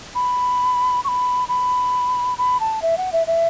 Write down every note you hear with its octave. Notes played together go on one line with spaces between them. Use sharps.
B5
C#6
B5
B5
B5
A5
E5
F#5
E5
E5